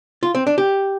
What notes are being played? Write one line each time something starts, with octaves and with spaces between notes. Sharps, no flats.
F4
C4
D4
G4